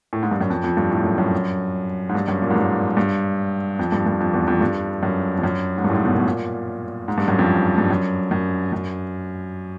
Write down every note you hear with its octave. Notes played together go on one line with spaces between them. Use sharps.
A2
G#2
G2
F#2
F2
F2
G2
A2
F#2
F#2
G#2
G2
F#2
A#2
G#2
G2
G2
F2
G2
G2
F2
E2
F2
G2
F#2
F2
F#2
G#2
G2
A2
G#2
B2
B2
A#2
G#2
G2
F#2
F2
G2
F#2
F#2
F#2